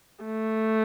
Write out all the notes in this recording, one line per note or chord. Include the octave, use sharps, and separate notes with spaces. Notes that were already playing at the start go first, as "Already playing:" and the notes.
A3